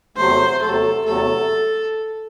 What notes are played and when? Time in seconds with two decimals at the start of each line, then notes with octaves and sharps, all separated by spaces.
0.17 E2 C3 F#3 A3 C5
0.62 E2 C3 F#3 A3 A4
1.06 E2 C3 F#3 A3 A4